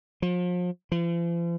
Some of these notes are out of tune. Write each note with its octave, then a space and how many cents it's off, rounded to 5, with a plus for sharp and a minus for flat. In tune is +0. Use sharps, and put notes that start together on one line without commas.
F3 +35
F3 -45